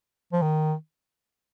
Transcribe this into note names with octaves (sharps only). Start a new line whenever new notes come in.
F3
D#3